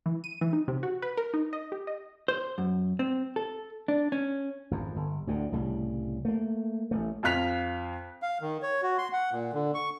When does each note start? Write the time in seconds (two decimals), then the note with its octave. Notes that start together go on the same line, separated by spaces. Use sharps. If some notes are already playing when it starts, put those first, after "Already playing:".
0.06 E3
0.24 D#7
0.41 E3
0.53 D#4
0.68 C3
0.83 F#4
1.02 B4
1.17 A#4
1.34 D#4
1.53 D#5
1.72 G4
1.87 D#5
2.28 C5
2.58 F#2
2.99 C4
3.36 A4
3.88 D4
4.12 C#4
4.71 G#1 F2
4.96 G1
5.27 D2 A2 D3
5.52 C2 A2 C#3 G3
6.25 A3 A#3
6.91 A1 A3
7.23 F2 F4 F5 F#6 B6 F7
8.22 F5
8.41 D#3
8.62 C#5
8.82 F#4
8.98 C6
9.13 F#5
9.32 A#2
9.53 D3
9.74 C#6